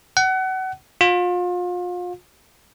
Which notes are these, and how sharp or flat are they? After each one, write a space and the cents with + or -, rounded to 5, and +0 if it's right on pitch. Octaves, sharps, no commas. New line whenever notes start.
F#5 +30
F4 +35